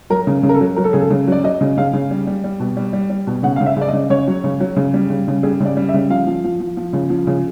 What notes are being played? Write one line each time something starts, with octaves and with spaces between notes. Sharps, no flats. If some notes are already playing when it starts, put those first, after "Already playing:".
F#3 A#4
C#3
C#3
A#4
A4
F#3
F#3 A#4
A4
C#3 G#4
A4
C#3
F#3 D5
F#3 D#5
C#3
C#3 F5
C#3
G3
G3
G3
B2
G3
G3
G3
B2
C#3 F#5
C#3 F5
E5
C#3 D5
D#5
C#3
C#3 C#5
F#3
C#3
F#3
C#3
G3
C#3
C#3
G3 G#4
C#3 D5
G3
E5
C#3
F3 F5
F3
F3
F3
F3
C#3
F3
C#3